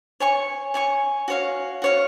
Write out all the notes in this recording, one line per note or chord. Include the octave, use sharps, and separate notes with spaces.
C#5 G#5 C#6
C#5 G#5 C#6
F#4 C#5 F5
F#4 C#5 F5